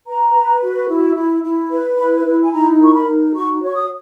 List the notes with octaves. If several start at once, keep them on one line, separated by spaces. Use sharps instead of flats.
B4 A#5
B4
F#4
E4
E4
E4
B4
E4 B5
E4
G#5
D#4 A#5
A#4 C#6
B5
D#4
F#4 C#6
C#5 C#6
D#6